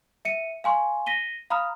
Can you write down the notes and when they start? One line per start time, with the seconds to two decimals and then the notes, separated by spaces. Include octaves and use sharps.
0.25 E5 C#7 D#7
0.64 F5 G#5 C6 C#6
1.06 A#6 B6 D#7 G7
1.50 F5 A#5 B5 D#6 F6